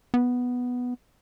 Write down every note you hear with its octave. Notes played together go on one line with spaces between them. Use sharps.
B3